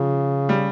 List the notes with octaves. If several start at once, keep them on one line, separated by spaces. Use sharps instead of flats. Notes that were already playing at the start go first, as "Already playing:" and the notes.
Already playing: C#3 F3
G3